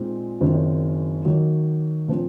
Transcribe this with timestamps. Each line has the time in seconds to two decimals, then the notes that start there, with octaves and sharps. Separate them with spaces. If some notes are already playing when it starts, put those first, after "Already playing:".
Already playing: A#2 G#3 C4 D#4
0.41 F#1 F#2 D#3 F#3 C4
1.25 D#3 F#3 A#3
2.08 A#2 F3 C4